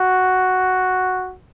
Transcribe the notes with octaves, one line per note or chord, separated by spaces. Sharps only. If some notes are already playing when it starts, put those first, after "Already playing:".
Already playing: F#4